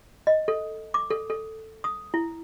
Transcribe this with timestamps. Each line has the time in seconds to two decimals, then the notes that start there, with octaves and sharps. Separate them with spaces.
0.27 D#5
0.48 A4
0.94 D6
1.10 A4
1.30 A4
1.84 D#6
2.14 E4